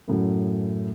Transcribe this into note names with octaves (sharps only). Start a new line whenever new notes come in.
F#2 A2 F#3